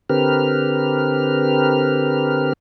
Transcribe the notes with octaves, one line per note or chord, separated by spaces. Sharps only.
D3 C4 G4 A#4 B4 F6